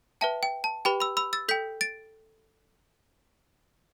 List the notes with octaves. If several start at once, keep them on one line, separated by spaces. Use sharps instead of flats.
B4 E5 G5 A5
G5
A5
G4 B4 G5 B5
B5 E6
B5 E6
E6 A6
A4 G5 G6 B6
A6 D7